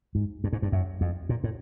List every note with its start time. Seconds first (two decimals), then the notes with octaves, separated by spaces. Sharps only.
0.15 G#2
0.44 G2
0.53 G#2
0.62 G2
0.72 F#2
1.01 F2
1.29 A#2
1.44 A2